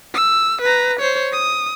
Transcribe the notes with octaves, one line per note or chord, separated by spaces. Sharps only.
E6
B4 A#5
C5 C#5
D#6